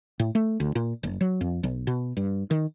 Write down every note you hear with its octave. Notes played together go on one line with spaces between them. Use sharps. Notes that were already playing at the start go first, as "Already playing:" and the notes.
A2
A3
D2
A#2
F#1
F#3
F2
B1
B2
G2
D#3